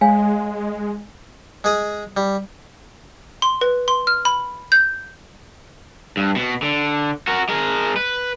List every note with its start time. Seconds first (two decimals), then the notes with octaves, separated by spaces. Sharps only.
0.01 G#3 C#5 F5 G#5
1.64 G#3 G#4 D#6
2.17 G3
3.42 C6
3.61 B4
3.88 C6
4.07 F6
4.25 B5
4.72 G6
6.17 G2
6.36 B2
6.63 D3
7.28 F#4 A#4
7.49 G#3 A#4
7.96 B4